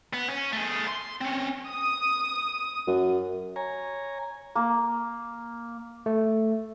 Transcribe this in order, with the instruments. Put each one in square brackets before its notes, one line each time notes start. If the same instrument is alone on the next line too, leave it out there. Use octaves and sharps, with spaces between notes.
[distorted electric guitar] B3
C#4
A3 G#4
C6
C4 C#4
[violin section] D#6
[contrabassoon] F#2
[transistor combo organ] C#5 G#5 A#5
[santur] A#3
[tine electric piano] A3